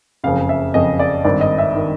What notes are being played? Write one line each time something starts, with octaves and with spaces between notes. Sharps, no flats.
F#1 F2 C#3 F5
E5
F#1 F2 C#3 D#5
D5
G#1 G2 D#3 D5
D#5
E5
D#3